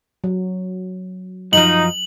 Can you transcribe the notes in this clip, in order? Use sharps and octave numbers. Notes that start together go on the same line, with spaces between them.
F#3
F#2 F3 D#4 F#7